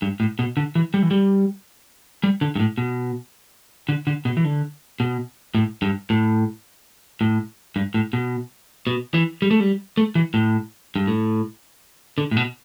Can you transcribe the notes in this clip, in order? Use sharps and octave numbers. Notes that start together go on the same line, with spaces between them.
G2
A2
B2
D3
E3
G3
E3
G3
G3
D3
G2
A2
B2
D3
D3
B2
E3
D3
B2
A2
G2
A2
A2
G2
A2
B2
B2
E3
G3
A3
G3
A3
E3
A2
G2
A2
D3
A2
B2